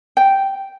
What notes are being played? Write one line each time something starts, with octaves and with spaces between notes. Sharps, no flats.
G5